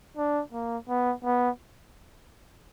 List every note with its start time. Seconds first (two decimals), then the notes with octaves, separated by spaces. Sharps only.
0.17 D4
0.53 A#3
0.89 B3
1.24 B3